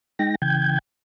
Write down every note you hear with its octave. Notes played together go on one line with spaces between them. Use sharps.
G#3 D#4 G5 A#6
C#3 E3 G5 G6 G#6